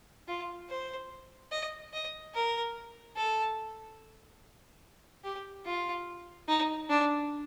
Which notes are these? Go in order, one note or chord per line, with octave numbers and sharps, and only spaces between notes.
F4
C5
D#5
D#5
A#4
A4
G4
F4
D#4
D4